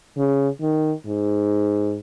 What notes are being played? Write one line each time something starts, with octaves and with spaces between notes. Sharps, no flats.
C#3
D#3
G#2